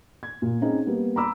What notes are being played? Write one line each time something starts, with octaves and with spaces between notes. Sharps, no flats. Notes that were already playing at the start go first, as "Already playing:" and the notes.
G#6
A#2
C4 C#4 D#4 G#4
G3 A#3 B3
A#5 B5 D6 E6